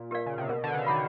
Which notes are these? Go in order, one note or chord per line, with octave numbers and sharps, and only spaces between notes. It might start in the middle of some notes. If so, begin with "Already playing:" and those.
Already playing: A#2
G4 A#4 D5 F5
C#3
C3
B2 A#4
D3
C#3
D#3 C#5 F#5 B5